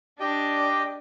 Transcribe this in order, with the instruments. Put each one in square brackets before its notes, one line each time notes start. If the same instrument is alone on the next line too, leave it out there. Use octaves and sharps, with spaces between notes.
[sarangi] D4 [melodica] G4 D#5 G5